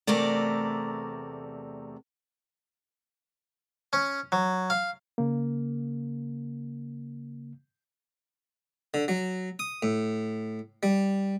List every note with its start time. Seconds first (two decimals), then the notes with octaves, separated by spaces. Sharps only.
0.07 E2 C3 A3 A#4 D5
3.93 C#4
4.32 F#3
4.70 F5
5.18 C#3 A#3
8.94 D3
9.08 F#3
9.59 D#6
9.83 A2
10.83 G3